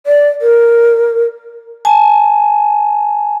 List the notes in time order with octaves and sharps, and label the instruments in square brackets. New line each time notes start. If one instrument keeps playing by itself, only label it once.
[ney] D5
A#4
[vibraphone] G#5 A5